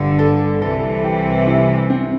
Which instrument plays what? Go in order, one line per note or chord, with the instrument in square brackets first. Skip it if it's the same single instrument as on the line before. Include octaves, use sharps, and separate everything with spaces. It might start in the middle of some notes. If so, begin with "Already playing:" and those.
Already playing: [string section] G1 G2 D3
[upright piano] A4
[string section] C2 C3 E3 [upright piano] A4
[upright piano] G4
E4
C4